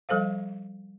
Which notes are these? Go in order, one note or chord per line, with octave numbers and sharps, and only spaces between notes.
F3 G3 A4 C5 F5